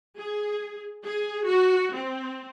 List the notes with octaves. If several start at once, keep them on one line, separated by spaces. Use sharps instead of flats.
G#4
G#4
F#4
C4